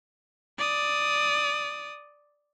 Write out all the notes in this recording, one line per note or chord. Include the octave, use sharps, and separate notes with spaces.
D5 D#6